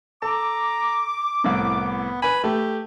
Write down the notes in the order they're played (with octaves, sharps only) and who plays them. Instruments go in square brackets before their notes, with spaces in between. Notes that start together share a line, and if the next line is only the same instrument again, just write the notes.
[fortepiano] A4 [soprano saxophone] A#5 [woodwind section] D6
[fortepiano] C2 A2 [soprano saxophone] B3
[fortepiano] B4 G#5 [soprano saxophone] B5
[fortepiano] A3 [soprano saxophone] G4